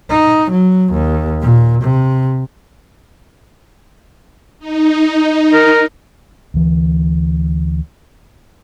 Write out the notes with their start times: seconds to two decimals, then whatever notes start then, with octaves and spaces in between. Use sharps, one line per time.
0.10 D#4
0.51 F#3
0.93 D#2
1.41 A#2
1.82 C3
4.59 D#4
5.53 A#4
6.54 D2 E3